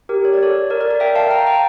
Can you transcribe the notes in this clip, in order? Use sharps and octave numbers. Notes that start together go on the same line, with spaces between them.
G4 A#4
C#5
D5
A4 C#5
A#4 D5
A#4 D5
A#4 D5
E5 G5
F5 A5
G5 A#5
G5 A#5